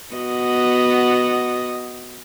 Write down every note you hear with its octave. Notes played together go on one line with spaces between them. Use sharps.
B3 F#4 D#5